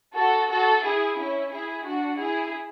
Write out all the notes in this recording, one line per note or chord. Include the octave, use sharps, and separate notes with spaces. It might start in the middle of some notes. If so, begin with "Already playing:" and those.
F#4 A4
F#4 A4
E4 G#4
C#4 E4
E4 G#4
D4 F#4
E4 G#4